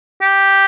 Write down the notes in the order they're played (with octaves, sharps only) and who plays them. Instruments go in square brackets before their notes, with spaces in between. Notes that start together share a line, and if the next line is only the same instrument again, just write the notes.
[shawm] G4